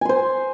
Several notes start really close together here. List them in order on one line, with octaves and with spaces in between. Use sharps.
G#5 C6 C5